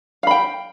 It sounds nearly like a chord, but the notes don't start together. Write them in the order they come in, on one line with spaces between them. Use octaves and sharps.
F5 B5 G5